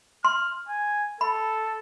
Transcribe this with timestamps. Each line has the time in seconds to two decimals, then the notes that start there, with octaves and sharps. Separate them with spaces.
0.25 C6 F6
0.69 G#5
1.21 A4 B5